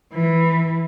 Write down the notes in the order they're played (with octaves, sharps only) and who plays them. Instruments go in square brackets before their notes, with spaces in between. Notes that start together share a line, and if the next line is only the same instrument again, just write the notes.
[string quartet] E3